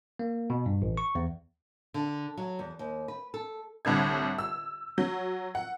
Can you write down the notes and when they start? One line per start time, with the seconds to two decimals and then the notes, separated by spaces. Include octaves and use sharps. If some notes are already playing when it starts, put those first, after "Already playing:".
0.19 A#3
0.50 B2
0.66 G2
0.82 A1
0.97 C#6
1.15 E2
1.94 D3
2.37 F#3
2.59 E2
2.79 D#2
3.08 B4
3.34 A4
3.85 C2 A2 D3 G#6
4.38 E6
4.98 F#3
5.55 F#5